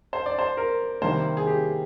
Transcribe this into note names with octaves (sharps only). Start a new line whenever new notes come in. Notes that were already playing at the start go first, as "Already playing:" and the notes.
C5
D5
C5
A#4
C3 D#3 G3 A#3 C5
G#4
G4